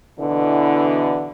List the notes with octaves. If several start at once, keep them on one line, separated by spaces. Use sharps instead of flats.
B2 D3 E3